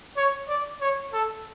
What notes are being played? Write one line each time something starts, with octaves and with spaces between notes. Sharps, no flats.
C#5
D5
C#5
A4